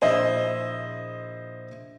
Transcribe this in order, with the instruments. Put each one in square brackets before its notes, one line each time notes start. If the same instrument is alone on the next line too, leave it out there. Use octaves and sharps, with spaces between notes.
[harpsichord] A#1 E4 [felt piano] C5 D#5 E5